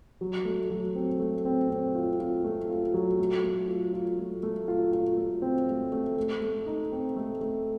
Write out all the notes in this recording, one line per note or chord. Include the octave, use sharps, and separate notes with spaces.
F#3
A3
F#3
C4
A3
C4
C4
F4
F4
A3
F4
F#3
A3
A3
F4
F4
A3
A3
F4
F4
A3
C4
A3
A3
A3
A3
D#4
C4
A3
A3